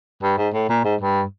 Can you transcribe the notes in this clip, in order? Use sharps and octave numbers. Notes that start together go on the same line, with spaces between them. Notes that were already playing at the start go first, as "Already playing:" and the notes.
G2
G#2
A2
A#2
G#2
G2